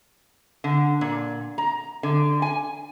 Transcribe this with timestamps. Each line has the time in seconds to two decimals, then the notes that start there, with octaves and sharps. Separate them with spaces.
0.64 D3
1.01 A#2
1.58 A#5
2.03 D3
2.42 G#5